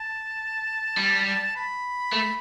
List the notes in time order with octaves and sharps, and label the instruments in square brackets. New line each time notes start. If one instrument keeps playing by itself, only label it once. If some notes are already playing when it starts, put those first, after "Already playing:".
Already playing: [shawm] A5
[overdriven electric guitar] G3
[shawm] B5
[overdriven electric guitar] A3